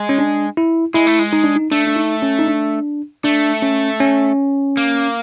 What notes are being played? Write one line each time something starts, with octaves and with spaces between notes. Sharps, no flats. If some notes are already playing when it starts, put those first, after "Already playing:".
Already playing: G#3
C#4
D4
E4
G#3 E4
A3
G#3
D#4
D4
D#4
A3 D4
D4
D#4
C#4
D#4
D4
A3 D4
C#4
C#4
A#3